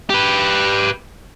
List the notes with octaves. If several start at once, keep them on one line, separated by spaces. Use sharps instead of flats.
G4 B4